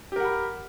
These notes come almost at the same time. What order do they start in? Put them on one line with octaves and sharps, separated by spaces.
G4 A#4 F#5 B5